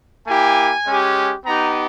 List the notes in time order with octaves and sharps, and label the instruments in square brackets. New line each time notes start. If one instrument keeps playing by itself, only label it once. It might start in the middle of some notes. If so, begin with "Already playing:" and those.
[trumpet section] A#3 E4 G4 G#5
G#3 C#4 G4
B3 D#4 G4 A#5